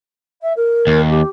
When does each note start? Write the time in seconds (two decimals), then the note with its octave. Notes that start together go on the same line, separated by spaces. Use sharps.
0.41 E5
0.56 A#4
0.87 D#2
1.10 G4